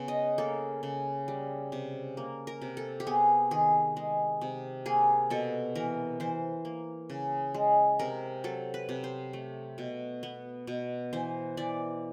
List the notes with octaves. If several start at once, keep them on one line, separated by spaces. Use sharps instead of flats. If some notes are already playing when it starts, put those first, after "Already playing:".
Already playing: C#3 B3
D#5
A#3 A4
C#3
G3
C3
A#3
A#4
C3
A4
G4
B3 G#4
D#3 G#4
G#3
C3
A#3 G#4
B2 A4
E3 A#4
E3 C5
A#3
C#3
G#3
C3 A#4
F#3 A4
B4
C3
C5
A3
B2
B3
B2
E3 C5
E3 D5